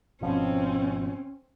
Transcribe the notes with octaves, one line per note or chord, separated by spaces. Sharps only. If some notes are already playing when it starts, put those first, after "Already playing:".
G#1 B2 F3 C4 C#4